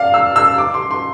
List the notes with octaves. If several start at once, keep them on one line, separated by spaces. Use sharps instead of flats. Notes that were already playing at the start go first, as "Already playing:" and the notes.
Already playing: D5 F5
E6
E6
D6
C6
C6